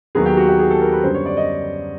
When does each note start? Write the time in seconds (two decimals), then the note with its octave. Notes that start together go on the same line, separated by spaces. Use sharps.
0.15 D#2 D#3 F#3 B3 G#4
0.26 G4
0.37 F#4
0.48 G4
0.59 G#4
0.70 A4
0.81 A#4
0.92 B4
1.04 F#2 D3 G3 B3 C5
1.15 C#5
1.26 D5
1.37 D#5